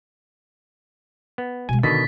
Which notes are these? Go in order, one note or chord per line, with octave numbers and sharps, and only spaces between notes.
B3
B2 G#3 G#5
B2 D3 D#3 D4 A6 B6